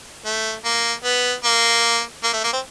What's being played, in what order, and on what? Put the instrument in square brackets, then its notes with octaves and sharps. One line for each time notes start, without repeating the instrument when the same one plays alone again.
[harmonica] A3
A#3
B3
A#3
A#3
A3
A#3
C4